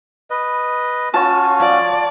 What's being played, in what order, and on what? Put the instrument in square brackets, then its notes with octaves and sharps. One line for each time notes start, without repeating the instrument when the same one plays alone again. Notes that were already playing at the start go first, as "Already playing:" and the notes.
[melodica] B4 D#5
[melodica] C#4 F#4 [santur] F4 C#5 G#5 [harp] A5
[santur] F3 [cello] D5